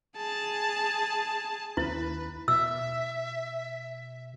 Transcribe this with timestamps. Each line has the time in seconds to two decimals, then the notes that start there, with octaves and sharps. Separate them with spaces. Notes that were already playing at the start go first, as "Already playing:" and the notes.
0.17 G#4 A5
1.77 D#2 E4 B4
2.48 B2 E5 E6